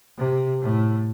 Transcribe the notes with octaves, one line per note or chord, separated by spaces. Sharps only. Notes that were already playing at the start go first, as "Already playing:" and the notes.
C3
A2